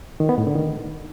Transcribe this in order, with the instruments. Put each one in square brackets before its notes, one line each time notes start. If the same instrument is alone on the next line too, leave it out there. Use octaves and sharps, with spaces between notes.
[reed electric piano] D#3
B3
A2
D3
D#3